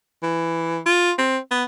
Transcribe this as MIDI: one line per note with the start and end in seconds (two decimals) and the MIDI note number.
0.23 0.79 52
0.86 1.12 65
1.18 1.38 60
1.51 1.64 59